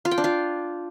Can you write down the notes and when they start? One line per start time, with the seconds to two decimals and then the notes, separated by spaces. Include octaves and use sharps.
0.05 F4
0.11 G5
0.18 D4
0.24 F4